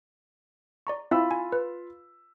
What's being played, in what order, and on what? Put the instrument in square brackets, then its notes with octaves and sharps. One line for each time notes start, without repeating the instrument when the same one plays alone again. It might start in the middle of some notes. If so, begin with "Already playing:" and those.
[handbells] D5 A#5 C#6
[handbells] C4 E4 E5 [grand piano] F4 B5 E6
[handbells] G#5
B4